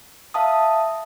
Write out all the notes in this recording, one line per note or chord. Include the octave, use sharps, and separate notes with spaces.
E5 F5 A5 D#6